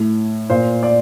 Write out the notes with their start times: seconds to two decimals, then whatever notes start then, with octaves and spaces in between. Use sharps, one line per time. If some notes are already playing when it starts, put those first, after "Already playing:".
Already playing: A2
0.50 A#2 C5
0.83 D5